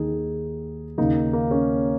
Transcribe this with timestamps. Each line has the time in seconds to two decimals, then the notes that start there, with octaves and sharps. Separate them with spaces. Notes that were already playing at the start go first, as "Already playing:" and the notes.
Already playing: D#2 D#3 D#4 G#4
0.98 D#2 C#3 A#3 D#4
1.33 A#3
1.51 C#4